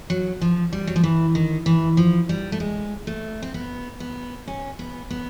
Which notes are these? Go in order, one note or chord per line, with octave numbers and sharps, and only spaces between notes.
F#3
F3
G3
F#3
F3
E3
D#3
E3
F3
G3
A3
G#3
A3
C4
B3
B3
C#4
B3
B3